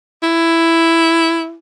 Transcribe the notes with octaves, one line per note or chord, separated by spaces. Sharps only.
E4